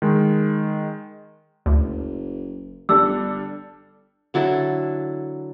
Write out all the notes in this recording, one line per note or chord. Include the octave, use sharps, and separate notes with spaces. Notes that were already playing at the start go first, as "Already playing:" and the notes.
D#3 G#3
F#1 D2
G1 G3 D4 A4 E6
D3 F#3 E4 A4